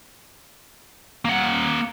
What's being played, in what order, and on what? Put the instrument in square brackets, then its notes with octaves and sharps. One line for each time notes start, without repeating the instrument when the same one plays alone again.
[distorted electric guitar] A#3 F#5